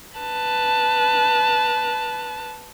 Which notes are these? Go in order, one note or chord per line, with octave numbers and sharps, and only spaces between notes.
B4 A5